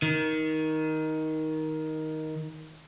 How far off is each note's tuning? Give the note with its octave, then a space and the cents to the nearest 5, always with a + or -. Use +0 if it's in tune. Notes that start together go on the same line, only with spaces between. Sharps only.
D#3 +10